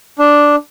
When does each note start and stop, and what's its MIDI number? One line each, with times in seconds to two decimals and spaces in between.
0.19 0.56 62